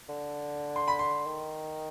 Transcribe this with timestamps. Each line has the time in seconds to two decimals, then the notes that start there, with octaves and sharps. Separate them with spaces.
0.09 D3
0.76 C6
0.88 B5
0.99 C6
1.26 D#3